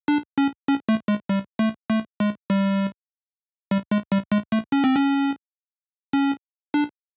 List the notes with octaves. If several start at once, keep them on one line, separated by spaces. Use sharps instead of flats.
D4
C#4
C#4
A3
G#3
G3
A3
A3
G#3
G3
G3
G#3
G3
G#3
A3
C#4
C4
C#4
C#4
D4